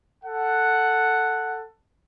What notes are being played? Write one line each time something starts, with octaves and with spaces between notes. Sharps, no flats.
A4 F#5